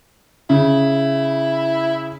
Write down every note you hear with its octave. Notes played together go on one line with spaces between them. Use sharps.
C#3 E4